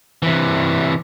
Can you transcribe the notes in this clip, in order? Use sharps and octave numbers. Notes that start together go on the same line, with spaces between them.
C3 E3